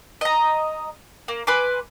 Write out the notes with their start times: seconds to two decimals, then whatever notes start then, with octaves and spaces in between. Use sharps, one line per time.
0.21 D#5 A#5
1.28 A#3
1.47 B4 G#5 C6 D6